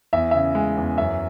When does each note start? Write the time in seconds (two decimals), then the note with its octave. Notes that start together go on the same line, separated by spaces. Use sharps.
0.13 E2 E5
0.31 C#3 E5
0.55 G#3
0.77 E2
0.97 F#2 E5